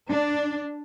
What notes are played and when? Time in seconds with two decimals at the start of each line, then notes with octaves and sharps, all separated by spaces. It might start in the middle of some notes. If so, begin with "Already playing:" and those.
0.10 D4